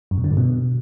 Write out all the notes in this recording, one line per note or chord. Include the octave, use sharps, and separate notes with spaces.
F#2
B2
D3
G2
B2